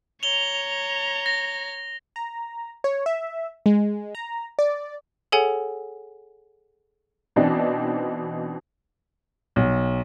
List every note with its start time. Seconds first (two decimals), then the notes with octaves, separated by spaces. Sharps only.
0.23 C#5 A#5 F7 G7
1.26 A#6
2.16 A#5
2.84 C#5
3.06 E5
3.66 G#3
4.15 A#5
4.59 D5
5.32 G#4 A4 C#5 F#5 G#5
7.36 B2 E3 C4 D4 D#4
9.56 B1